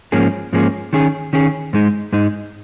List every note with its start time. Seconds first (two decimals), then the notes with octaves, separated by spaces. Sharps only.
0.12 G#2 F3 A#3 C#4 G#4
0.53 G#2 F3 A#3 C#4 G#4
0.93 D#3 C#4 G#4
1.33 D#3 C#4 G#4
1.73 G#2 G#3 D#4
2.12 G#2 G#3 D#4